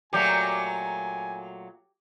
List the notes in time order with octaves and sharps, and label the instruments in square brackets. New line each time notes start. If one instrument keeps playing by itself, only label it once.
[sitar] A#2 F#3 A3 [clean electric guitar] G4 [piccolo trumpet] G#5